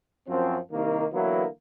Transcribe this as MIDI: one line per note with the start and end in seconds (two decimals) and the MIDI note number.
0.28 0.57 42
0.28 0.57 53
0.28 0.57 60
0.71 1.05 36
0.71 1.05 51
0.71 1.05 58
1.12 1.46 50
1.12 1.46 52
1.12 1.46 54
1.12 1.46 58
1.12 1.46 59
1.12 1.46 64